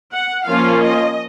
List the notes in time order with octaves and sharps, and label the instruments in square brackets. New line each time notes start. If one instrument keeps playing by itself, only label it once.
[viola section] F#5
F3 A#3 C#4 F4 F5
D#5